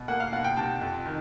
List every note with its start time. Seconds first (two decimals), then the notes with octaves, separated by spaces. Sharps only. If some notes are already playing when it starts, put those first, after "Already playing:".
Already playing: B2
0.08 A#3 F#5
0.20 F5
0.32 B2 F#5
0.44 G5
0.57 C3 A5
0.81 F2
1.06 D#3